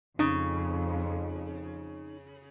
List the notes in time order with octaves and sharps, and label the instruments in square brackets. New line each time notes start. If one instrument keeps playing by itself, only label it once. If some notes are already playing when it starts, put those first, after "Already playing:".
[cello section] F2 [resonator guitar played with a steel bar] C#3 [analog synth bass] D#4